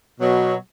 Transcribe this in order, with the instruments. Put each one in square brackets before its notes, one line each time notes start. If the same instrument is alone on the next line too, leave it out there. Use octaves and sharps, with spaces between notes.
[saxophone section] B2 F#3